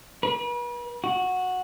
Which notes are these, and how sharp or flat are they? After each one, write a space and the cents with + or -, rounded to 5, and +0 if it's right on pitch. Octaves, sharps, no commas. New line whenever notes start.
B4 -40
F#4 -10